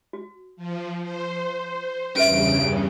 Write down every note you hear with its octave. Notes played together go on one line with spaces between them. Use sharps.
F#4
F3
C5
E2 G2 C#3 C#4 B4 E5 D7